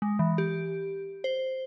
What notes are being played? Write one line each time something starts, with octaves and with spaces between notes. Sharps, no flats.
G#3
E3
G4
C5